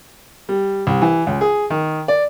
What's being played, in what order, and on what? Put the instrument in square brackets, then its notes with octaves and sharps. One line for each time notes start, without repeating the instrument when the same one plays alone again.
[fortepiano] G3
C2
E3
C#2
G#4
D#3
D5